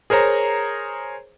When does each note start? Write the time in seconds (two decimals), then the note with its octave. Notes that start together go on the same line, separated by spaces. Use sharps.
0.10 G#4 A#4 C5 C#5 A#5